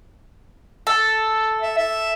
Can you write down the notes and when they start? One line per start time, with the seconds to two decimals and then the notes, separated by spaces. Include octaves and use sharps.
0.87 A4
1.61 E5
1.78 E5